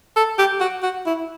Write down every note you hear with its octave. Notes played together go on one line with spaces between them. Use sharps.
A4
G4
F#4
F#4
E4